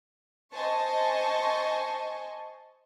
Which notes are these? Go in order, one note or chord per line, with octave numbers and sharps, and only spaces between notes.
C5 D#5 G#5 A5 C#6